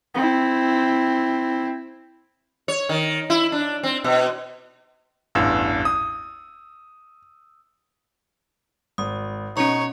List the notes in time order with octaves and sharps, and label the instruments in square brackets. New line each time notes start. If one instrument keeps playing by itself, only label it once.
[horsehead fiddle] C4 E4
[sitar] C#5
D#3
E4
D4
C4
B2
[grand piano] A1 E2 G2 E6
D#6
[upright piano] G#1 [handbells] D#6
[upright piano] B2 [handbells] C#4 C#6 [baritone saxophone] D#4 [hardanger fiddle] C#5